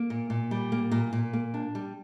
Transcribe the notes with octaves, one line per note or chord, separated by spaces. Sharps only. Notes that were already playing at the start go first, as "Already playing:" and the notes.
Already playing: A#3
A#2
A#2
G3
A#3
A#2
A#2
A#3
D4
G3